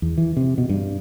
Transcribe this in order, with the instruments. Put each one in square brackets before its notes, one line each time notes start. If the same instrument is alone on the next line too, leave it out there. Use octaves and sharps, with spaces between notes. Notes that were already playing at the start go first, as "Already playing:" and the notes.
[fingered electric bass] E2
E3
C3
B2
G2